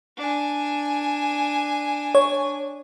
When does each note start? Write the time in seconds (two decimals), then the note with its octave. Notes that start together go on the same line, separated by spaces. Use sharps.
0.17 D4 G#5
2.15 C#5